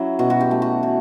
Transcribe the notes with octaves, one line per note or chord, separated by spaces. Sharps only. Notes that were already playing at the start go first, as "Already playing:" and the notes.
Already playing: F#3 C#4 E4
B2 F#4
F#4
G4
A3
F#4
E3